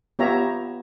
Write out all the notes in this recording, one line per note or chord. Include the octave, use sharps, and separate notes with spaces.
B3 F4 G4 C#5 E5 A#5